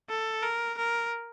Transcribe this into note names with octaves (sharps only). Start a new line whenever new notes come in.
A4
A#4
A#4